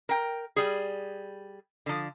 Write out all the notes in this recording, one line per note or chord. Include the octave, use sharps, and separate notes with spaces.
A#4 G5
G3 G#4
D3 F3